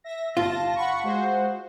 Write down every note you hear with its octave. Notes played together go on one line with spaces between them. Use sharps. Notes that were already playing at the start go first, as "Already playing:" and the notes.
E5 A#6
G1 F4 A5 A#6
F#5 B5 C#6
G#3 F#4 C5